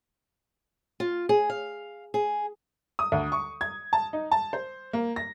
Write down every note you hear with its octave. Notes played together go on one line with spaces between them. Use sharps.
F4
G#4
F5
G#4
D#6
D2
C#6
G#6
A5
D#4
A5
C5
A#3
A#6